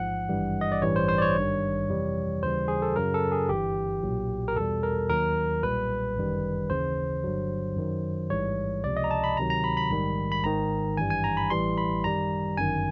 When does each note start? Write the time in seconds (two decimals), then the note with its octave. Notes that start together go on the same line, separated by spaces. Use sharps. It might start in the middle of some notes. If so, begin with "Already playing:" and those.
Already playing: A1 G#2 F3 F#5
0.29 G#1 G2 E3 G3
0.61 D#5
0.72 D5
0.82 A1 G2 E3 G3 C#5
0.96 C5
1.08 C5
1.18 D5
1.22 C#5
1.36 G#1 G2 D#3 G3
1.89 F2 C3 E3 G3
2.43 D#2 C#3 E3 G3 C5
2.68 G#4
2.82 A4
2.96 F#2 C#3 F#3 A#4
3.14 A4
3.32 G#4
3.49 G1 G2 E3 G4
4.03 B1 A#2 F#3
4.48 A#4
4.56 E2 B2 G3 A4
4.83 A#4
5.09 D#2 D#3 F#3 A#4
5.63 B1 A#2 G3 B4
6.16 G1 F#2 D#3 G3
6.70 D#2 C#3 E3 C5
7.24 G1 G2 D3 F#3
7.77 F#2 D#3 F#3
8.30 A1 G#2 E3 G3 C#5
8.84 C#2 C3 F3 D5
8.97 D#5
9.04 A#5
9.11 A5
9.24 B5
9.37 D2 C3 D#3 F#3 A#5
9.50 A#5
9.64 B5
9.77 B5
9.91 A#1 G#2 D#3 G3
10.32 B5
10.44 G#1 G#2 D#3 A#5
10.97 G#1 G2 E3 G3 G#5
11.10 G#5
11.24 A#5
11.37 B5
11.50 A1 A2 E3 G3 C6
11.78 B5
12.04 F#2 D#3 G3 A#5
12.57 G1 F#2 D#3 G#5